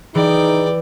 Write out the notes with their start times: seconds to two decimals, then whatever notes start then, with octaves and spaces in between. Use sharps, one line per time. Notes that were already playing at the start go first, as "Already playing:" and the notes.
0.15 E3 D#4 G#4 D5 G5